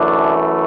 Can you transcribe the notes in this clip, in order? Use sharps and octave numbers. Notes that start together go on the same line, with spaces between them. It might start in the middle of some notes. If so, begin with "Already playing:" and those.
Already playing: F#2 E3 A3 D4